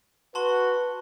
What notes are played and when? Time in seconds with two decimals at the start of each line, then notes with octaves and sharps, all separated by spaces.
0.35 F#4 B4 A5 C6 G7